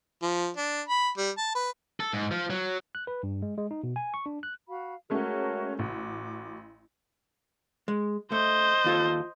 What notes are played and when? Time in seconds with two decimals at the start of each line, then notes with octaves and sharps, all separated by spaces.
0.22 F3
0.57 D4
0.88 B5
1.18 G3
1.38 A5
1.55 B4
2.00 A4
2.13 G#2
2.31 F3
2.50 F#3
2.95 F#6
3.07 B4
3.23 G2
3.42 G#3
3.58 G#3
3.71 D#4
3.83 B2
3.96 G#5
4.14 C#6
4.26 D4
4.43 F#6
4.68 F#4 F5 B5
5.10 G#3 A3 C#4 F#4 A#4 C#5
5.79 A1 F#4 D6
7.88 G#3
8.32 A3 C5 D#5
8.85 D#2 F4 A4